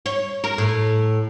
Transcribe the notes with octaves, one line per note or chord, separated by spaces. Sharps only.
C#5
A#4
A2